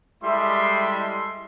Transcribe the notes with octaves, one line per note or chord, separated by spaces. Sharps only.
G3 G#3 E4 A4 E5 C6